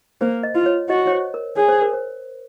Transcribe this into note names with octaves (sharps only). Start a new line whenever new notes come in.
A#3 C5
D#5
F4
C#5
F#4 D#5
C#5
C5
A#4
G#4 C#5
C5
A#4
C5